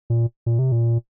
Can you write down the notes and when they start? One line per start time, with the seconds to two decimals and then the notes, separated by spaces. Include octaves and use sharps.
0.10 A#2
0.46 A#2
0.59 C3
0.72 A#2